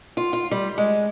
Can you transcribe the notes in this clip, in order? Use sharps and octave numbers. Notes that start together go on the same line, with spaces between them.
F4
F4
G3
G#3